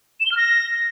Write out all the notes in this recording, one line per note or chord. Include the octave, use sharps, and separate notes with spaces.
E7
G7
F6
A#6